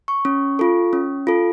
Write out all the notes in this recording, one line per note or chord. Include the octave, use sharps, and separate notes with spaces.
C#6
C#4
F4 A4
C#4
F4 A4